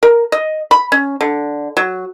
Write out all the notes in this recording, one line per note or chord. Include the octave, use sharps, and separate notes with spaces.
A#4
D#5
B5
C#4
D3
F#3